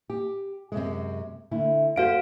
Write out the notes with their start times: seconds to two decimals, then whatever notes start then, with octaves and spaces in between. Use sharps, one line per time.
0.10 G4
0.72 F#2 C3 G#3
1.51 D3 A3 E4
1.96 F#2 F#4 A4 C5 F5 D7